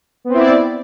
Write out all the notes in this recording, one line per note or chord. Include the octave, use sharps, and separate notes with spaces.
B3 C4 E4 D5